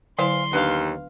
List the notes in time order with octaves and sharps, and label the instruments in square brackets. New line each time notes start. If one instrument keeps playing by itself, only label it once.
[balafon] D3 F#3 E4 [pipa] E3 C5 F5 [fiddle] C6
[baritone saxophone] D#2 [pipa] B3 B4 F5 [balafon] D4